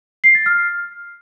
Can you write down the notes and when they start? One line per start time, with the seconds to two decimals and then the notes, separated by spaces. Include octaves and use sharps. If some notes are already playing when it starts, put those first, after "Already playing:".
0.24 C7
0.35 A6
0.46 F6